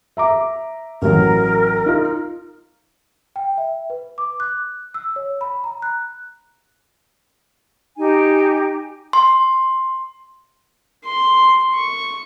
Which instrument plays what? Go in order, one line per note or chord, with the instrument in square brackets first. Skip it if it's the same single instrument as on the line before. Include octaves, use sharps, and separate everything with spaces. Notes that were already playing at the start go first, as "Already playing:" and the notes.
[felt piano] E5 A#5 D6
[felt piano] A1 F#3 [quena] A#4
[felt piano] D#4 F4
[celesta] G5
E5
B4
D6
F#6
E6
C#5
B5
A#5
F#6
[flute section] D#4 G4 G#5
[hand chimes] C6
[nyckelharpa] C6
C#6